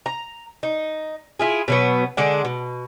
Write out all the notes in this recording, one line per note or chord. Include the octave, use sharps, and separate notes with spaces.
A#5
D#4
E4 F4 G#4
B2 F#3 B3
D3 G#3 D4 F#5
B2